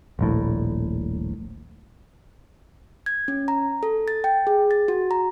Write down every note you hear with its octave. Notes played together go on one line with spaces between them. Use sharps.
D#1 A#1 A2
G#6
C#4
A#5
A4
A6
G5
G#4
A6
F#4
A#5